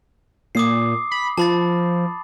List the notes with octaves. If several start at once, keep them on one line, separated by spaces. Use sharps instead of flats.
A#2 D6 D#6 C7
B5
F3 A5 B5 A6